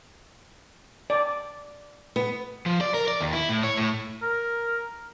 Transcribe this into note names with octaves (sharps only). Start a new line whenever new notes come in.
D5
B3
F3
D5
A#4
D5
D#2
E4
A2
C#5
A2
A#4